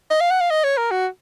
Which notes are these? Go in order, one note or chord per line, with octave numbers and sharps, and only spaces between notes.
D#5
F5
F#5
F5
D#5
C#5
A#4
F#4